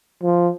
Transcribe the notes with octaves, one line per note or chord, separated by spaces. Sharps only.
F3